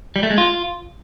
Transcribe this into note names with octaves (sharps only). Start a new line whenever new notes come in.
G3
A3
G#3
F4